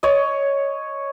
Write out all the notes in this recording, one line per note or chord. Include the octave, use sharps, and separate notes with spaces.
C#5 D#5